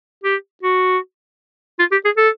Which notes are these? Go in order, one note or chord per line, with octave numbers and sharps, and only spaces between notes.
G4
F#4
F4
G4
G#4
A4